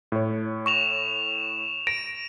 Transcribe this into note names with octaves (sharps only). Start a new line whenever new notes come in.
A2 C#5
C#6 E7 F7
A#6 D7